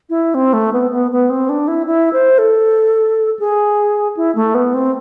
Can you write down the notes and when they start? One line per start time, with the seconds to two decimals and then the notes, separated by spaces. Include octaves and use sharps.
0.10 E4
0.34 C4
0.53 A3
0.73 B3
0.91 B3
1.11 B3
1.30 C4
1.49 D4
1.68 E4
1.87 E4
2.13 C5
2.38 A4
3.39 G#4
4.17 E4
4.35 A3
4.55 B3
4.74 C4